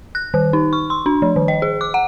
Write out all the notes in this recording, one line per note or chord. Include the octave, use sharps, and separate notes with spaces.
F#6
D#3
D#4
C#6
C6
D4
F3
D#3
D#5
G#4
D6
F#5